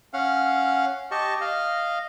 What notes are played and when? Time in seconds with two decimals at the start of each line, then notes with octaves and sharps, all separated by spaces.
0.13 C#4 F5 F#5
1.11 G4 D#5 A5 C#6
1.41 D#5 F5